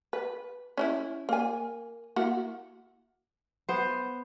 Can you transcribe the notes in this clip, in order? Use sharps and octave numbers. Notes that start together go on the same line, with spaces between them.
B4
C#4 D4 E4
A#3 G#5
A#3 E4 F#4
B3 C5